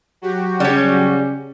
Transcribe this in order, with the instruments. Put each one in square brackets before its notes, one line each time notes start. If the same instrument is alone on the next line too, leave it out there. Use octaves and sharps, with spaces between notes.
[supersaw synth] F#3 F#4 G4
[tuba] C#3 [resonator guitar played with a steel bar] G3 C#4